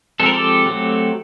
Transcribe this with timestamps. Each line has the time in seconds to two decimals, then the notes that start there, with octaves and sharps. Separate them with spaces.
0.20 F3 G#3 C4 A4
0.26 A#4
0.33 G4 A4
0.66 F#3 A3 C4